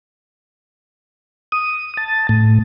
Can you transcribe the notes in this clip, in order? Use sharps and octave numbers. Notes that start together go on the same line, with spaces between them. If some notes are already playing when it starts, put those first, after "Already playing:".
D#6
A5
A2